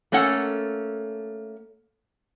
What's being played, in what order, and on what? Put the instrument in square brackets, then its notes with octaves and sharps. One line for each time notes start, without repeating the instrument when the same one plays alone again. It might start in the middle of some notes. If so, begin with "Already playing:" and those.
[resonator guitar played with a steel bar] A3 A#3 C#4 A4 F#5